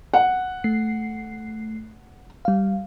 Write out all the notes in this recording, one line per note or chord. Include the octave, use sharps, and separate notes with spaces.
F#5
A3 C7
G3 F5